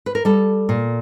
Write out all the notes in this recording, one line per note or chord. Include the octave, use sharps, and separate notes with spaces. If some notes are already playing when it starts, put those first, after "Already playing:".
B4
A#4
G3 A4
A#2